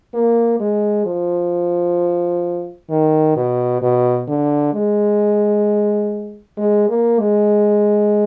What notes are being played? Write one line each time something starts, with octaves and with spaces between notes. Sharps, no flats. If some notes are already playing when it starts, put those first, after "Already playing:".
A#3
G#3
F3
D#3
B2
B2
D3
G#3
G#3
A#3
G#3